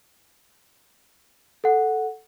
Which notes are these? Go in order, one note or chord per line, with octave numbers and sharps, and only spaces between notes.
A4 F#5